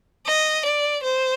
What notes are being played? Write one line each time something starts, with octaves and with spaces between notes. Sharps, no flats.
D#5
D5
C5